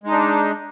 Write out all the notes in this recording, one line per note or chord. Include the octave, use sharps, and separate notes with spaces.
G#3 D4 D#4